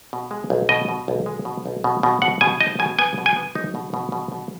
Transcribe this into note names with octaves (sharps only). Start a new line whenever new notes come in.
B2
G#3
B1
B2 D#5
B2
B1
G#3
B2
B1
B2
B2
B2 F#5
B2 G#5
D#4 D#5
B2 G#5
B3 G#5
B2
G#5
B3
D#4
B2
B2
B2
B2